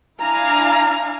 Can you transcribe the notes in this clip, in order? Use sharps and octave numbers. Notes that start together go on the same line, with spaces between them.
D4 E4 F5 G#5 A#5